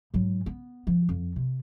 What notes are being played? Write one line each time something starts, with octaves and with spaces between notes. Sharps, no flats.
G#2 F#3
B3
F3
F2
C3